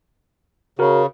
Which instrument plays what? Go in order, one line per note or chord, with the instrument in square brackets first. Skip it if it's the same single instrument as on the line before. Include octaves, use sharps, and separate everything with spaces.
[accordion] C#3 [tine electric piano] F#4 A#4